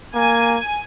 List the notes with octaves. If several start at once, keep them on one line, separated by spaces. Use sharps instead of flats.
A#3 G#5